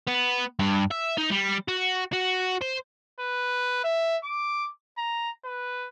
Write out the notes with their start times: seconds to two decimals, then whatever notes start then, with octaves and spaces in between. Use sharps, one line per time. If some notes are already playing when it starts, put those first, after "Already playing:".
0.07 B3
0.59 G2
0.91 E5
1.17 D#4
1.31 G3
1.68 F#4
2.13 F#4
2.62 C5
3.20 B4
3.84 E5
4.24 D6
4.98 A#5
5.45 B4